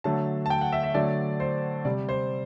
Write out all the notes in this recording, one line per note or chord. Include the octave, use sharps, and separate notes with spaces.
D3 F#3 A3 A5
A5
G5
F#5
E5
E5
D3 F#3 A3 D5
C5
C3 G3 D5
C5